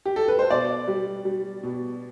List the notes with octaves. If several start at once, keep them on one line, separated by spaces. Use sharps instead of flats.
G4
A4
B4
C5
B2 D5
G3
G3
B2